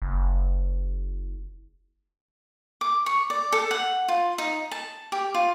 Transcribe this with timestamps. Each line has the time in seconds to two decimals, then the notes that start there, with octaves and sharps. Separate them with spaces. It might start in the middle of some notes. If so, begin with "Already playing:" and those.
0.02 F#1
2.81 D6
3.06 C#6
3.30 D5
3.52 A4
3.71 F#5
4.08 F4
4.38 D#4
4.71 A5
5.12 G4
5.34 F4